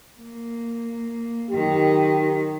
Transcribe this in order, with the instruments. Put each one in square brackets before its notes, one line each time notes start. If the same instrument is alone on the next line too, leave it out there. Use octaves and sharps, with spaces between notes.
[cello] A#3
[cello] F#2 D#3 [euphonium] G4